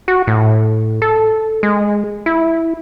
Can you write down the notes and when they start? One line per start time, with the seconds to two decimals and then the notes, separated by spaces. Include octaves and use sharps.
0.08 F#4
0.27 A2
1.02 A4
1.63 G#3
2.26 E4